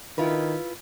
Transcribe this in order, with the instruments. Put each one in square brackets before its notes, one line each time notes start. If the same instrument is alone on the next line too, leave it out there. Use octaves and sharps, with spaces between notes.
[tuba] D#3 [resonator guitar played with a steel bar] E4 F4 B4